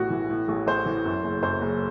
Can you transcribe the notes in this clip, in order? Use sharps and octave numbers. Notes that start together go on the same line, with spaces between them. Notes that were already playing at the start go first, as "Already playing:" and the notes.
Already playing: A1 A2 E3 F#4
E3
A2
A1
A1 C5
E3
F#2
F#1
F#2 C5
F#1